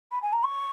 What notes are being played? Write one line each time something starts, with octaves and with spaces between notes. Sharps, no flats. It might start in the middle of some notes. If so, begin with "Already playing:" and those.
B5
G#5
A#5
C#6